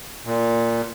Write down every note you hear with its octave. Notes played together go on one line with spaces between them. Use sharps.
A#2